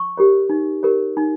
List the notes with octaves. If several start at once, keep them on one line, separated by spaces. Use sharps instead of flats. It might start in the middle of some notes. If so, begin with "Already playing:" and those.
Already playing: C#6
G4 A#4 C#5
D#4
G4 A#4 C#5
D#4